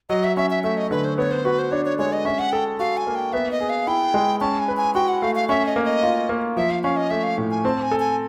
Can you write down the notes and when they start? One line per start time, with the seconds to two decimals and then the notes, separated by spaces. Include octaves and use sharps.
0.09 F#3 D#5
0.24 E5
0.37 C#4 E5
0.50 E5
0.64 A3 E5
0.77 D#5
0.91 D3 B4
1.05 C5
1.18 B3 C#5
1.31 C5
1.45 F#4 B4
1.59 C5
1.71 D4 C#5
1.85 C#5
1.99 G#3 C#5
2.13 D#5
2.25 C#4 E5
2.39 F#5
2.52 A4 G5
2.79 F#4 F5
2.97 G#5
3.07 A#3
3.15 G5
3.33 B3 E5
3.51 D#5
3.60 G#4
3.69 F5
3.87 E4 G5
4.14 G#3
4.41 C#4 A5
4.59 G#5
4.68 B4
4.77 G#5
4.94 F#4 G5
5.08 F#5
5.22 A3 F5
5.35 F5
5.49 C#4 E5
5.66 D#5
5.76 A#3
5.85 D#5
6.03 F4
6.29 A#3
6.57 F3 E5
6.71 F5
6.83 C#4 F5
6.96 D#5
7.10 A3 E5
7.23 F5
7.38 A2
7.51 G#5
7.65 C4 A5
7.82 G#5
7.91 A4
8.00 G#5